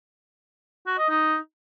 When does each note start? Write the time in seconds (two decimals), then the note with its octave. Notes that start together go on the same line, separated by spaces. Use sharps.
0.87 F#4
0.98 D#5
1.09 D#4